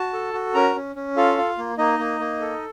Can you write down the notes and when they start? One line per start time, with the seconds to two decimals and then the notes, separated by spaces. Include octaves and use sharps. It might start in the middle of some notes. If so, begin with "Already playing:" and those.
Already playing: F#4 A5
0.13 A4
0.33 F#4
0.54 C#4 A#4 A#5
0.76 C#4
0.96 C#4
1.17 F4 A4 F5
1.38 F4
1.58 A#3
1.78 A#3 D#4 D#5
1.99 A#3
2.20 A#3
2.40 A4